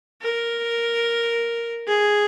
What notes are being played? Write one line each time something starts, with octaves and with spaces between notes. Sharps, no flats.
A#4
G#4